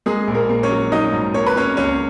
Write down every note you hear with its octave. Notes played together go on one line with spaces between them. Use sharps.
G#3 A#3 G#4
A#1
A#3 A#4
A#3
C#4 C#5
F#3
F#3 D#4 D#5
G#2
A#3 C#5
B4
A#3 C#4 C#5
C#2 C#4 C#5